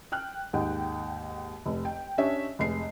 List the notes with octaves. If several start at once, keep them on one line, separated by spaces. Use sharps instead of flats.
G5 F6 F#6
D#2 G#2 D#3 F#5 G5
F1
G5
C#4 D4 G4 C#5 D#5 E5
F1 G#3 C7